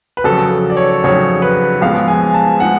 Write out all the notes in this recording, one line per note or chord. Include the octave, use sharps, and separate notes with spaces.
B4
F2 C#3 F#3 A4
D5
C#5
F2 C#3 F#3 C#5
B4
F2 F3 G#3 B3 F5
G#5
A5
F3 G#3 F#5